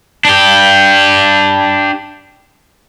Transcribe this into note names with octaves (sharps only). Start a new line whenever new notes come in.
D4 G4